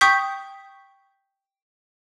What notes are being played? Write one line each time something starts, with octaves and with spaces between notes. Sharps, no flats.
G5 C#6 D#6 G6 B6